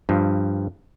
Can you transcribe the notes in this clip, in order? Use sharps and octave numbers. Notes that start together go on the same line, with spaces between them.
G2 F3